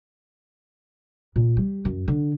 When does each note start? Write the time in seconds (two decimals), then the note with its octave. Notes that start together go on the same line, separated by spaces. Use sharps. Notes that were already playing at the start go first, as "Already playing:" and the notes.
1.36 A#2
1.57 G3
1.85 F#2
2.08 D3